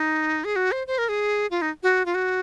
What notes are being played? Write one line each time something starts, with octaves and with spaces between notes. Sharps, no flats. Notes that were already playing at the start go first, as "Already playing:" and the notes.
Already playing: D#4
G#4
F#4
C5
C5
A#4
G#4
F4
D#4
F#4
F4
F#4